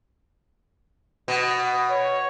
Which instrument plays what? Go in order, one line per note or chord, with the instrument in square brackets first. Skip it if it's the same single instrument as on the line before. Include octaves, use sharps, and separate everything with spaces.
[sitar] B2
[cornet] C#5